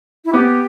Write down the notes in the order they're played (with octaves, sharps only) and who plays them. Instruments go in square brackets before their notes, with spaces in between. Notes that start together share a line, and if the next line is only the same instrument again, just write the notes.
[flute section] E4
[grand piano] B3 [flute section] G4